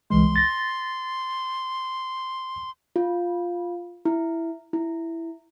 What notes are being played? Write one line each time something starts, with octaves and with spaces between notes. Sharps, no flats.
C2 E3 G#3 C6
A6 A#6
F4
E4
E4